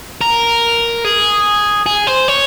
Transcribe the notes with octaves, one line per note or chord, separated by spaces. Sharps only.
A#4
G#4
G#4
C5
C#5